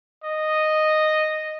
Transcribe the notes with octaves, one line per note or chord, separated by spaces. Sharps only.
D#5